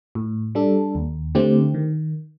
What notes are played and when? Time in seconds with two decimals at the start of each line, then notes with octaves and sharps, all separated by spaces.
0.15 A2
0.55 G3 D4 A4
0.95 D#2
1.35 D3 A3 C4 G4
1.74 D#3